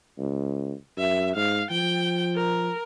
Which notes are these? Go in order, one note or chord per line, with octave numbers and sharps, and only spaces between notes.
C#2
F#2 E5
G#2 F5
F3 G5
A#4